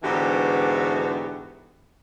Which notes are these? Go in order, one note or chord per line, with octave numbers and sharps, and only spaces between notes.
G#2 D3 E3 B3 F#4 G4